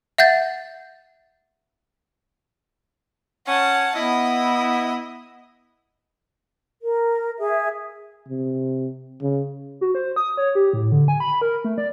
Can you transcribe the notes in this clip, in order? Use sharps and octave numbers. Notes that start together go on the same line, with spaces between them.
E5 F#5 G6 A6
C#4 F#5 A5
B3 E4 D#5
A#4
G#4 E5
C3
C#3
F#4
C5
D#6
C#5
G4
A2
D3
G#5
B5
A#4
A3
D5